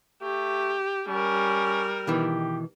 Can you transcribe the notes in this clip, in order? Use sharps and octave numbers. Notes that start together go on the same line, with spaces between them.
A3 G4
G3 C#4 A#4
B2 D#3 E3 G4